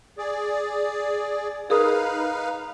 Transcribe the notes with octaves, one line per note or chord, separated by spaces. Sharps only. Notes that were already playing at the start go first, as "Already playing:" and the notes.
G#4 D5
D#4 G#4 A#4 B4 F5 D#6